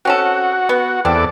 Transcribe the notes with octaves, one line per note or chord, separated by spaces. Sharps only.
C4 C#4 F#4 A4
B3
E2 C4 A4 D5